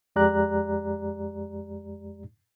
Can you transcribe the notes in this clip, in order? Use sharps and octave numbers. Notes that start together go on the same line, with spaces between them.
F2 G#3 G4 D5 A#5 F#6